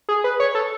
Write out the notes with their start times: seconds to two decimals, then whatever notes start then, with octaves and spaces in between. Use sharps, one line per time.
0.09 G#4
0.24 B4
0.40 C#5
0.55 A4